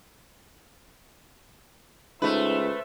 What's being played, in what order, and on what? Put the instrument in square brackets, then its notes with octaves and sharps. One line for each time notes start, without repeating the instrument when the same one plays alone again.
[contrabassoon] C#2 [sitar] A3 B4 [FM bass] D#4 [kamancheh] C5 E5